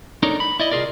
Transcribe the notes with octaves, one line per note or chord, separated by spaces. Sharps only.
D4 D#4 A4 A#4 C#5 D5
B5
E4 D5 D#5
C2 F4 G#4 A#4 D5